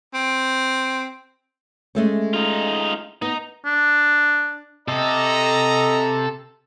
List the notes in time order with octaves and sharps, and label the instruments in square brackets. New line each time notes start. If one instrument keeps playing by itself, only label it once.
[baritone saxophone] C4
[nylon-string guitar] G#3 A3 C#4
[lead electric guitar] D#4 F4
[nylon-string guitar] B3 [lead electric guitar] D#4
[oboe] D4
[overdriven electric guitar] C3 [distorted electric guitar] A4 [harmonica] D#5 [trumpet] A#5